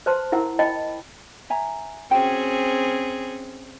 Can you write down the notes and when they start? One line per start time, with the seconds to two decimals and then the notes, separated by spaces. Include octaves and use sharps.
0.06 B4 C5 A5 C6
0.32 E4 A#4 F#5
0.59 D#5 G5 A5 B5
1.50 E5 G#5 A#5
2.11 C4 C#4 F#4 G#4 C5 G5